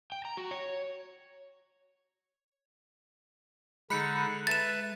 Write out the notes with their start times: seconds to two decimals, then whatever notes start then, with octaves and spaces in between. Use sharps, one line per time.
0.12 G5
0.25 A#5
0.37 F#4
0.51 C#5
3.90 D3 G#3 D#4 A4 B5 F#6 C#7
4.47 B4 E5 A5 A6 E7